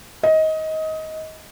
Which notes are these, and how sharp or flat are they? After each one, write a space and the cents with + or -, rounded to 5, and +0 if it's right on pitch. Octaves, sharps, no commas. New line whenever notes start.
D#5 +20